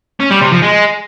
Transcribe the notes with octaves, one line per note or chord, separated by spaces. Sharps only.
C#4
G3
C3
F3
G#3